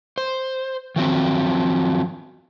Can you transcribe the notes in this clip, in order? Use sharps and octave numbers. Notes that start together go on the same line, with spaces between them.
C5
D#3 F3 F#3 C4